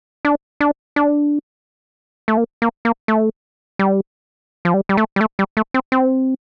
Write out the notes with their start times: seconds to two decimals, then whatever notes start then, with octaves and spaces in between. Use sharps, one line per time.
0.25 D4
0.60 D4
0.96 D4
2.28 A3
2.37 A#3
2.62 A#3
2.85 A#3
3.08 A3
3.79 G3
4.65 F3
4.74 G3
4.89 G3
4.97 A3
5.16 G3
5.21 A3
5.39 G3
5.57 A3
5.74 C4
5.92 C4